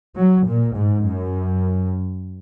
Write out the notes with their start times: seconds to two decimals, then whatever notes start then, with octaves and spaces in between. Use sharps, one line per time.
0.17 F#3
0.46 A#2
0.76 G#2
1.05 F#2